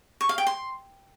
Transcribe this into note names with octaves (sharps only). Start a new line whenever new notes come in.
C#6
F5
G5
C6